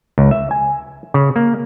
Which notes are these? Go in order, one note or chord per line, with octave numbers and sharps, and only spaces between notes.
C#2
E5
G#5
C#3
A#3